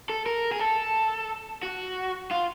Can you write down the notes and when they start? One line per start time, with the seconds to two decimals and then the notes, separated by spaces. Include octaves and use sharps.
0.09 A4
0.26 A#4
0.52 G#4
0.60 A4
1.63 F#4
2.31 F4